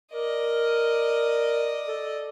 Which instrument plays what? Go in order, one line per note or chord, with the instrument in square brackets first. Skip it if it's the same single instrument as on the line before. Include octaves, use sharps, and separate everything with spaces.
[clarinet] A#4 [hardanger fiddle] D5 D#5
[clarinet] A4